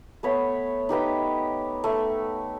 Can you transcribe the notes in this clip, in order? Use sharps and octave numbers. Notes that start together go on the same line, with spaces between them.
A3 B3 C#5 B5
D#4 G4 B4 G5
A3